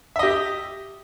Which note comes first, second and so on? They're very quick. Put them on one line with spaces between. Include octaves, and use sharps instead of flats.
E5 D#5 G4